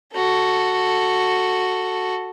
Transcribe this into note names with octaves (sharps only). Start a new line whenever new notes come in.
F#4 A4